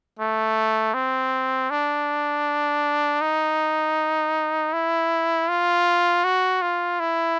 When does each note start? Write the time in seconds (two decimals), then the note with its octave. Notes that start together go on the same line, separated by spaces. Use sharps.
0.19 A3
0.94 C4
1.70 D4
3.21 D#4
4.73 E4
5.49 F4
6.24 F#4
6.62 F4
7.00 E4